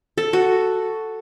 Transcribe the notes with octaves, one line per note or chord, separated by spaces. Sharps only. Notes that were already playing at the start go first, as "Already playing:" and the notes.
A4
F#4